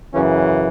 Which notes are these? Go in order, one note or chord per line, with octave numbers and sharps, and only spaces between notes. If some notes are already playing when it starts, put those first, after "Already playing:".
F#2 C#3 E3 C#4